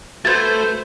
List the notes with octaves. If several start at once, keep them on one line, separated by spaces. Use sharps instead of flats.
A3 F#4 A4 B4 C5 G#6 A6